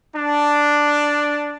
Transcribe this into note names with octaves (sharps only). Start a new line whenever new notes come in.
D4